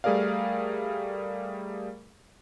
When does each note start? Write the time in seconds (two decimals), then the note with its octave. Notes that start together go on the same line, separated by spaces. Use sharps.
0.04 G3 A3 G#4 A#4 D5 F5